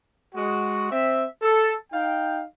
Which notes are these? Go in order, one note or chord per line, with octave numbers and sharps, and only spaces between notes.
G#3 F#4
C4 E5
A4
D#4 F5 G5